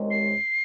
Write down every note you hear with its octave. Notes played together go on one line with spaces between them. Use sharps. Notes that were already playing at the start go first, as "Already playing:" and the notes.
Already playing: C2 C3 D#3 G#3 C#4
C7